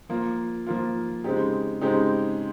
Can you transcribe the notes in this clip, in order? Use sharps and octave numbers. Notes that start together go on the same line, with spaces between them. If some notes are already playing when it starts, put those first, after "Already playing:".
F3 A#3 F4
F3 A#3 F4
C#3 G#3 C4 D#4 G4
C#3 G#3 C4 D#4 G4